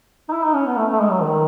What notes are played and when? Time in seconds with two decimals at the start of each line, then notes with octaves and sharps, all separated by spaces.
0.29 D#4
0.33 E4
0.44 D#4
0.55 C#4
0.67 B3
0.77 A3
0.92 A3
1.00 G#3
1.11 F#3
1.22 D#3